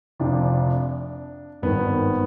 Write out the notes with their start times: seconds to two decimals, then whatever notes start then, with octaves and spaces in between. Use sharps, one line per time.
0.20 F1 F2 C3 F3 D4
1.62 G#1 G2 D#3 B3